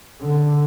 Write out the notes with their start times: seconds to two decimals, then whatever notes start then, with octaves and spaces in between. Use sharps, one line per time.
0.21 D3